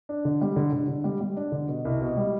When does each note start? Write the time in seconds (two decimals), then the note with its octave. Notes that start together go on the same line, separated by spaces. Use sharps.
0.09 D4
0.25 D3
0.41 G3
0.56 D3
0.73 D3
0.88 D3
1.04 G3
1.21 G3
1.37 D4
1.52 D3
1.68 B2
1.85 C2
2.01 B2
2.17 G3